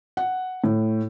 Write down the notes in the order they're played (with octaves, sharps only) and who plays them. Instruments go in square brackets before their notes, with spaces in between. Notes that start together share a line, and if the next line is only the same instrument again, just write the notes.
[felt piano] F#5
A2